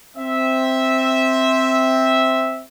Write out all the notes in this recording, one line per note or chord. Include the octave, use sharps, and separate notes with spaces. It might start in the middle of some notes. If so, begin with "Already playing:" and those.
C4 E5